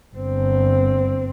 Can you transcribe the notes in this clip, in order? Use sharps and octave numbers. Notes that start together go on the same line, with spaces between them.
G1 C4